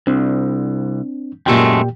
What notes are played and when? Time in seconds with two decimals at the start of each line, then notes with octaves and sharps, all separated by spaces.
0.07 C2 C4 D4
1.46 F#2 A#2 G#3 A3 G4 G5